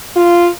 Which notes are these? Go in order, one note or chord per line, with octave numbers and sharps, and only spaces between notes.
F4